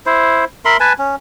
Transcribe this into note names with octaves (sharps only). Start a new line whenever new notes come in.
E4 C5
A#4 E5 B5 C6
B4 G#5 A5
C#4